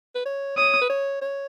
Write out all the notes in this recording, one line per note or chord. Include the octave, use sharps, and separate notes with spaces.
B4
C#5
C#5 D#6
B4
C#5
C#5